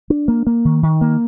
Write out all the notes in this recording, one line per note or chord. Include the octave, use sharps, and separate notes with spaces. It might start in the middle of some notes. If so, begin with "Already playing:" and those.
D4
A#3
A#3
D#3
D#3
A#3